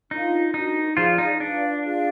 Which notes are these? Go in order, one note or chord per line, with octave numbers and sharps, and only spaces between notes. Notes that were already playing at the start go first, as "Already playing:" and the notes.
D4 D#4 F4 A#4 F5
D4 D#4 F#4 A#4
F3 F4 G#4 D5 F5
D#4
D4 F4 B4 D5 F5
F4 G#4 D5 F5